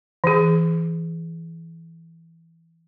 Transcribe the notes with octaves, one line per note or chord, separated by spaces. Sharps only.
E3 G#4